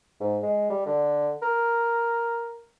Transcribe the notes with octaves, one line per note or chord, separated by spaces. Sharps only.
G#2
G#3
G3
D3
A#4